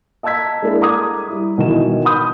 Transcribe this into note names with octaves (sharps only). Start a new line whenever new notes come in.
D#5 A5 A#5 E6 G#6 B6
G#3 A#3 D4 E4 A4
A#5 D6 D#6 G#6
G3 E4
B2 D#3 E3 E7
B5 D#6 G6